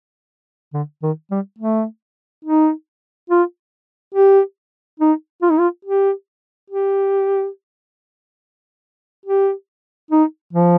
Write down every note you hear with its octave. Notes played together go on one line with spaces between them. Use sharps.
D3
D#3
G3
A3
D#4
F4
G4
D#4
F4
D#4
F4
G4
G4
G4
D#4
F3